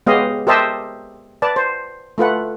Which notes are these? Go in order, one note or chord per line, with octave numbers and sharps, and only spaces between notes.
G#3 B3 G4 C#5 D#5 F5
G4 A#4 C5 D#5 E5 A5
B4 D5 A5
C5
A3 F4 B4 F#5